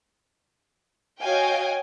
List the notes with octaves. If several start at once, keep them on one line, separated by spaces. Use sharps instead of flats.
F#4 C#5 D#5 F5 G5 G#5